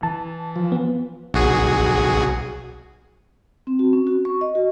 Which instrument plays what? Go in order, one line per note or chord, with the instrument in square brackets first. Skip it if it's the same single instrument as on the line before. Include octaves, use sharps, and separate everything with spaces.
[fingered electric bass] E3 [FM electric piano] A5
[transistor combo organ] F3
[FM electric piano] B3
[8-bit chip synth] B1 F#4 G#4
[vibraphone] C4
F#4
C#4
F#4
C#6
D#5
F#4